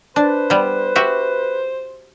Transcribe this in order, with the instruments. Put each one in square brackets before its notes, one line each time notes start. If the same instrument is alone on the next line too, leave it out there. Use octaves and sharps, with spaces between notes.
[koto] D4 [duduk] B4 [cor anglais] C5
[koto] G3 B3
F#4 G4 E5